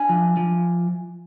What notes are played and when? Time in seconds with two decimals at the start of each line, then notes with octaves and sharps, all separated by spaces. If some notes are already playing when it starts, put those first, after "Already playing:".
Already playing: D4 G#5
0.09 F3
0.37 F3